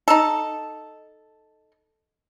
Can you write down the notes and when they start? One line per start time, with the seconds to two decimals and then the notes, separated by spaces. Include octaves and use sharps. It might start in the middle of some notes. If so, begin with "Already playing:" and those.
0.08 D#4 A4